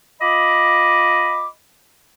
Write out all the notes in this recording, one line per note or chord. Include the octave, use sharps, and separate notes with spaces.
F4 D#5 B5 D6